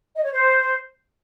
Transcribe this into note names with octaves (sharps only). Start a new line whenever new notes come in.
D#5
C#5
C5